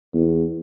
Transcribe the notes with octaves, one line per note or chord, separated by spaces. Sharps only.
E2